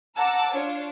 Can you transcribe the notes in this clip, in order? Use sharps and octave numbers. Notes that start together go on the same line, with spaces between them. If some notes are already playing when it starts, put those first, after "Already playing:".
F#5 A5 A#5 D6 E6
D4 F4 C#5